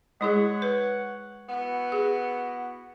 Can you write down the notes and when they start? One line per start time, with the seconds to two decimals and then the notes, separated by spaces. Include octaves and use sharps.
0.21 G#3 E4 G#4 C#5 F#5
0.62 B4
1.48 B3 E4 F#4
1.92 G#4